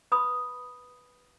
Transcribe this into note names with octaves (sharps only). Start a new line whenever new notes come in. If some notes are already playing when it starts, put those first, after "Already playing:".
B4 B5 C6 D#6